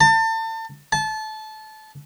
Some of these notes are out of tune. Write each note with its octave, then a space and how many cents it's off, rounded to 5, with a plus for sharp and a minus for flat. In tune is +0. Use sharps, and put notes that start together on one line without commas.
A5 +35
A5 -20